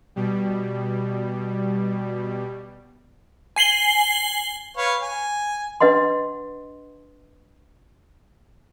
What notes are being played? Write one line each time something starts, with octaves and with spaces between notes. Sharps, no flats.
B2 G3
G#5 C7 F#7 G7
B4 C#5 F5
G#5
D4 B4 D#5 F#5 C6